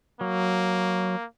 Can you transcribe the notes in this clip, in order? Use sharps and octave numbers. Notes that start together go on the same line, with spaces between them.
F#3 A#3